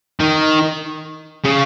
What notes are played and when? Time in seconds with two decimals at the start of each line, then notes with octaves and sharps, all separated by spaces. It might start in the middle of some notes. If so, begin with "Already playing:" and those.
0.20 D#3
1.45 C#3